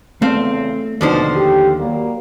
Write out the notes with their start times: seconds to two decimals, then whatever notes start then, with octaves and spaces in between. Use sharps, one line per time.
0.22 E2 C#3 A3 C4 F5
1.01 D#2 B2 D3 F3 D#4 C5
1.36 G4
1.80 F#3 G3 A#3